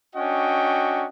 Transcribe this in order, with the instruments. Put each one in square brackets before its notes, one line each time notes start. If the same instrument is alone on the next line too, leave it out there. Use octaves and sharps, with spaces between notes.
[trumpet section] C#4 D4 F#4 D#5 G5